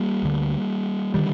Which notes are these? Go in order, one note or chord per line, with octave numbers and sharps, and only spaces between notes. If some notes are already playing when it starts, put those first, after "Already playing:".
Already playing: G3 A#3
D2 D3
D3 D#3 G3